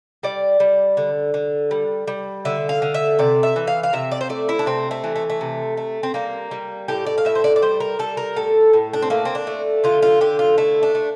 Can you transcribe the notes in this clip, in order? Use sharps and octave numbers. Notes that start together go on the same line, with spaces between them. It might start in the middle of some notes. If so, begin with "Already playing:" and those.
G3 D5
G3
D3
D3
G3
G3
D3 E5
F5
D3
E5
C3 D5
E5
E3
F5
F5
C3 E5
D5
C5
A3 D5
E4
D4
C3 C4
A3
E3
A3
A3
C3
A3
C4
G3 A#3
G3
A2 G4
D5
F5
A2 E5
C5
D5
D5
G3 C5
A#4
G3 A4
A#4
A2 A4
A2
D4
C4
A3 A#3
C4
D4
A3
D3 F4
F4
D3 G4
F4
A3 E4
D4
A3